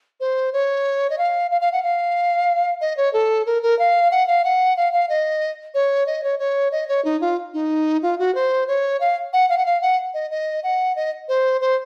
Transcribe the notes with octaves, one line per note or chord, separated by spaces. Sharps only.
C5
C#5
D#5
F5
F5
F5
F#5
F5
D#5
C#5
A4
A#4
A#4
F5
F#5
F5
F#5
F5
F5
D#5
C#5
D#5
C#5
C#5
D#5
C#5
D#4
F4
D#4
F4
F#4
C5
C#5
F5
F#5
F5
F#5
F5
F#5
D#5
D#5
F#5
D#5
C5
C5